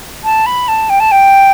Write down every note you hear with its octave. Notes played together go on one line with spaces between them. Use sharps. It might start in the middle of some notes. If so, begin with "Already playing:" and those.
A5
B5
A5
G5
A5
G5